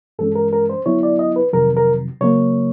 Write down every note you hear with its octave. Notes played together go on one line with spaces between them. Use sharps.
G2 E3 G#3 C#4 A4
A#4
A#4
C5
D3 F#3 B3 E4 C#5
D5
D#5
B4
F2 C3 D#3 F#3 A#4
A#4
C#3 F#3 A#3 C#5